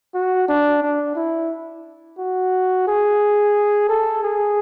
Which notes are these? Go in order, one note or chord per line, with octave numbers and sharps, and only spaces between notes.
F#4
D4
D4
E4
F#4
G#4
A4
G#4